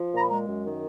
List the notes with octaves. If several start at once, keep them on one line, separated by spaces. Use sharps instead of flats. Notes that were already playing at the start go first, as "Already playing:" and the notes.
Already playing: F3
A#2 A#5
B5
G#3 A#5
F#2
D#3